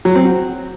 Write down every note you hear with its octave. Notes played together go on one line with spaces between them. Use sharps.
F#3
C4
F#4